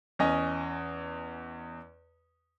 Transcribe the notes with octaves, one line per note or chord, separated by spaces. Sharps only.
E2 C#4 D#5